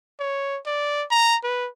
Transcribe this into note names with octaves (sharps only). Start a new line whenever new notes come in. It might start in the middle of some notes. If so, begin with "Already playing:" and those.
C#5
D5
A#5
B4